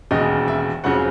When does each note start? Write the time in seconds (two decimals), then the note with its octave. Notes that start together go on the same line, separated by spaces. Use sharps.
0.11 E1 D#2 C#3 D#5
0.48 E5
0.83 F1 F2 C#3 F#3 F#5